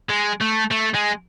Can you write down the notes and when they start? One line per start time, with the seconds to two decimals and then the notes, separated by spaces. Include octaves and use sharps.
0.10 G#3
0.41 A3
0.72 A3
0.95 G#3